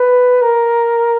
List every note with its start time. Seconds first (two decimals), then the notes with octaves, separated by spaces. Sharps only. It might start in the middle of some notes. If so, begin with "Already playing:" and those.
Already playing: B4
0.42 A#4